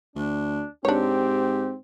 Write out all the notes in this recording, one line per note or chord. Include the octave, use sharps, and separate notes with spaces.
D2 D4
G#2 C4 D4 G4 C#5